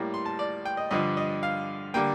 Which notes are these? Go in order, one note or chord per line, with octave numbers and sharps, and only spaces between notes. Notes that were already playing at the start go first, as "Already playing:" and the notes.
Already playing: A2 G3 A#3
C6
A5
D5
G5
D#5
G2 D3 F3 D#5
D#5
F5
D3 G3 A#3 G5